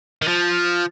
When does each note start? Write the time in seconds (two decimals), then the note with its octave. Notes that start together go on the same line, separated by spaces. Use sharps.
0.22 D#3
0.28 F3